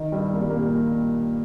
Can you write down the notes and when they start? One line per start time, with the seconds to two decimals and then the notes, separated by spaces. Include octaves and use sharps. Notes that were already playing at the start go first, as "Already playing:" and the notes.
Already playing: D#3 D#4
0.12 G2 G3
0.33 A#3
0.41 G3
0.49 A#2 A#3